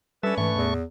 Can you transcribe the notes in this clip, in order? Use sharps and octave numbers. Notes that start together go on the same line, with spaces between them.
G3 C#4 D4 A4 B4 E5
G#2 E3 A3 C#6
E2 A2